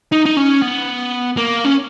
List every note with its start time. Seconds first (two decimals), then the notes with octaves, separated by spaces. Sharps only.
0.12 D#4
0.26 D#4
0.37 C#4
0.62 B3
1.37 A#3
1.64 C#4